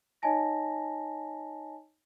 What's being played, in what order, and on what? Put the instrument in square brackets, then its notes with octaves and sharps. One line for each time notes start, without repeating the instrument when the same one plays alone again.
[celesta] D#4 C#5 D#5 G#5 A5 A#6